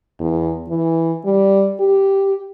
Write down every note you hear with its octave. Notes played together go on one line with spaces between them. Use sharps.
E2
E3
G3
G4